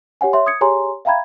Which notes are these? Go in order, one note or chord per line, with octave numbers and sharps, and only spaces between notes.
G4 C#5 F#5 G#5
C#5 E5 C6
D#6 G#6 C#7
G4 G#4 C#5 G#5 A#5 C6
E5 F5 G5 A#5 B5 G#6